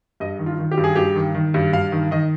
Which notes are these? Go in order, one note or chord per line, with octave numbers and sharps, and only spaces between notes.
G2 D#5
D#3
F4
D#3
G4
G2
G#4
G2 G4
D#3
D#3
G2
G2 F5
D#3
D#3 D#5